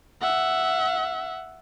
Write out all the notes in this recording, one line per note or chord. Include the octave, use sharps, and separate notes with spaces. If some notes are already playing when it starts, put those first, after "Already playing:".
E5 F#5